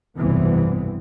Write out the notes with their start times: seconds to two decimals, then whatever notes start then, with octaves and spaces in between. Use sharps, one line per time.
0.18 F1 B1 G2 E3 B3 C4